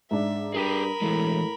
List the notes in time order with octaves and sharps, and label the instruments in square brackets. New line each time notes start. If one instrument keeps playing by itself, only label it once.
[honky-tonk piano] G#2 D4 [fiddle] E5
[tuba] G2 [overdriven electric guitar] G#4 G5 [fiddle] A#4 B5 [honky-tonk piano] D#6 B6 D#7
[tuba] A2 [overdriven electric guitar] E3 G#3